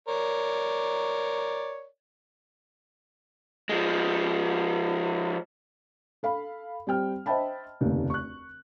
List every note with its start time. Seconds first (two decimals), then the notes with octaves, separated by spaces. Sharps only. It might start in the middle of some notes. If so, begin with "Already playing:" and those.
0.08 A#4 C#5 D5
3.69 F3 G#3
6.23 A4 F5 B5
6.87 G3 C4 G5 F6
7.26 C5 D#5 E5 G5 A5 B5
7.80 F1 D#2 C#3 A3
8.10 C#6 F#6